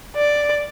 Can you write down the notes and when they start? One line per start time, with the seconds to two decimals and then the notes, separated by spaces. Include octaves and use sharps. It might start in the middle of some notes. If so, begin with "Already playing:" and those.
0.16 D5